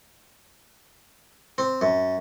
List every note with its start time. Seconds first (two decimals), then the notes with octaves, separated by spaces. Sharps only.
1.58 C4
1.81 F#2